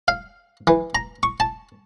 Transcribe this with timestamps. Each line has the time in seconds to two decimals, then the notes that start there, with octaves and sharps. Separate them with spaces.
0.08 F5
0.67 E3
0.95 A#5
1.23 C#6
1.40 A5